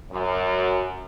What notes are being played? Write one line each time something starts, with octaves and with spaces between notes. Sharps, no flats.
F#2